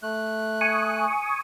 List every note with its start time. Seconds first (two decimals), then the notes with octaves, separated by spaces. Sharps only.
0.03 A3 F#6
0.61 G#5 C#6 D#6